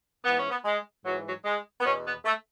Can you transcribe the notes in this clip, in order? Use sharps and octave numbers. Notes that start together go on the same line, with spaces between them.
G#2 E3 B3
C#4
B3
G#3
G#2 E3 F#3
F#3
G#3
B3
E2 B2 C#4
B3
A3